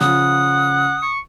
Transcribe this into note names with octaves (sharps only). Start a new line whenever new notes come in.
C#3 F3 F#5 D#6
C#6